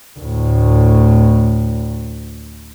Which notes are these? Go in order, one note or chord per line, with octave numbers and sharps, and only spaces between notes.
D2 A2